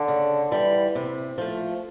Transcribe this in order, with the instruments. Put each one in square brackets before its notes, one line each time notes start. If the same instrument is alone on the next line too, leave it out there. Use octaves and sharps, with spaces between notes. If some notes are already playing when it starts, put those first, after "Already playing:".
Already playing: [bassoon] D3
[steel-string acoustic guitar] C#3
E3 G3
C3
F3 A3